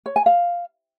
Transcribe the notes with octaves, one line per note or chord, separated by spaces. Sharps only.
C#5
G#5
F5